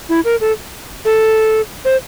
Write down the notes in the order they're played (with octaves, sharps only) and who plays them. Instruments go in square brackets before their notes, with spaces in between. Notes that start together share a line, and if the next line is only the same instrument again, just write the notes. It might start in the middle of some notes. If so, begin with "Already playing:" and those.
[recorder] E4
A#4
A4
A4
C5